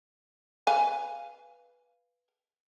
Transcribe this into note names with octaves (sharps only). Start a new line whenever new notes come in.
B4 F5 G#5